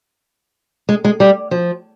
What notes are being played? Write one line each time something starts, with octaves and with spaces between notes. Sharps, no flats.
G#3
G#3
G3
F3